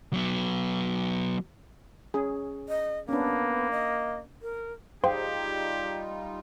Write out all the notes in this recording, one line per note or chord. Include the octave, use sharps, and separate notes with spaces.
F#3 B3
C#4 G#4
D#5
A#3 B3 C#4 D4
D#5
A#4
G3 D#4 F4 G4 G#4 C5 F5 G5